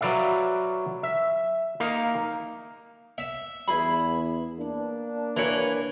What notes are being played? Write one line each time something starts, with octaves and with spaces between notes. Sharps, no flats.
F#3 B4 D5 E5 F5
E5
A#3 D#4 F5
E5
E2 E4 G#4 B5
A#3 D4
E3 A#4 B4 C#5